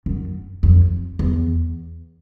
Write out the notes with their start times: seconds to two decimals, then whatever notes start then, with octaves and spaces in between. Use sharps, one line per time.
0.06 F#2
0.63 F2
1.19 E2